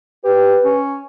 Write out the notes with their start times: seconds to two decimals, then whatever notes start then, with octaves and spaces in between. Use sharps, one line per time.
0.24 G4 B4
0.64 C#4